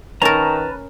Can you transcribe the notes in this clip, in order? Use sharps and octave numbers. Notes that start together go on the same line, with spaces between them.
D#3 C#4 A#4 B4 A5 A#5